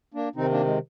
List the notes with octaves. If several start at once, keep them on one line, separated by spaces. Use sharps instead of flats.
A#3 D4
C3 D#3 C4 D#4
A#3 D4
G#3